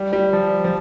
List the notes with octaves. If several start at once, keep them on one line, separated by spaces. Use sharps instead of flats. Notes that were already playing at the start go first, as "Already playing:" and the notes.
Already playing: G3
G3
F3
F3